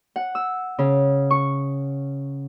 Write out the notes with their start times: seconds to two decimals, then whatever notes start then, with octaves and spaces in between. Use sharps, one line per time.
0.16 F#5
0.35 E6
0.79 C#3
1.31 C#6